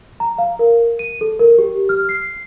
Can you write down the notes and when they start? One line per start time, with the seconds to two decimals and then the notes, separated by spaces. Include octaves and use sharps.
0.20 A#5
0.38 F5
0.59 A#4
0.99 D#7
1.21 A4
1.39 A#4
1.58 G4
1.89 F6
2.09 C7